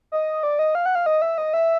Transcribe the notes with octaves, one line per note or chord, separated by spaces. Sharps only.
D#5
D5
D#5
F5
F#5
F5
D#5
E5
D#5
E5